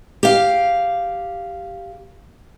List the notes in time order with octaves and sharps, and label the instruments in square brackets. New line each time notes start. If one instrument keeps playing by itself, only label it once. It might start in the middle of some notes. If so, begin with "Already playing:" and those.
[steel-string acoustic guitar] G4 F5